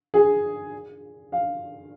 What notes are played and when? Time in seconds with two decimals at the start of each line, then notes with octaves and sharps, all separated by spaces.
0.14 G#4
1.32 F5